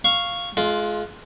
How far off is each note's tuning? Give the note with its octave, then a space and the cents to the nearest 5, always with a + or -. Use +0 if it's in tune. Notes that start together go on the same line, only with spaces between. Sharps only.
F5 +0 C#6 +0
G#3 +30 F4 +0